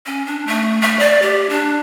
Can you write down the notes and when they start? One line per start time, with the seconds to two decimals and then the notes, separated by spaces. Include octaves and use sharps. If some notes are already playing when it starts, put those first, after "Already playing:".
0.06 C#4
0.26 D4
0.47 A3
0.82 A3
0.99 D5
1.22 G4
1.49 D4